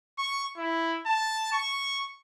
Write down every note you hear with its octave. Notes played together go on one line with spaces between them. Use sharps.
C#6
E4
A5
C#6